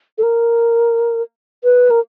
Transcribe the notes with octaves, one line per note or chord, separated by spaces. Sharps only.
A4
A#4
B4
A#4